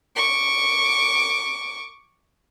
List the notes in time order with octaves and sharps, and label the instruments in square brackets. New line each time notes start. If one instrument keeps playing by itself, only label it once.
[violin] C#6 D6